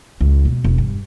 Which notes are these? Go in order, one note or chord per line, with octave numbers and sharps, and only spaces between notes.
C#2
B2
E1
G2